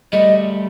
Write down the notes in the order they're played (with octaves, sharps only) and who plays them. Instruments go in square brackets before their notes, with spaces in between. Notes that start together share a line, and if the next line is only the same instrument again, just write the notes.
[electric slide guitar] G3 A3 [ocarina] D#5